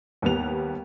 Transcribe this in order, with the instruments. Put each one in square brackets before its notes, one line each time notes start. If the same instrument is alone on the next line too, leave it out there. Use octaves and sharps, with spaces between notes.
[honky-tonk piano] D#2 G3 B3 F7